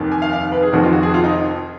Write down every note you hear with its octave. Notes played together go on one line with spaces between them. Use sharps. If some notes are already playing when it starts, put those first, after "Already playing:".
Already playing: F1 D#2 D#3
G#5
F5
F5
B4
G#4
F1 F2 D#3 F#4
F4
F#4
G#4
F4
D#4